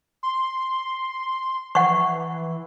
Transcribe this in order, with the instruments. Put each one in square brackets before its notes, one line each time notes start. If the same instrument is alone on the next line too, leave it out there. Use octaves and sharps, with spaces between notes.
[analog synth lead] C6
[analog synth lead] E3 [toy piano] F#5 C#6